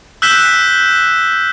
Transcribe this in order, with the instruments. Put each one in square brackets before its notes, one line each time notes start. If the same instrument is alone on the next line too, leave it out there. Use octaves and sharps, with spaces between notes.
[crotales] E6 F#6 G6 B6 E7 G7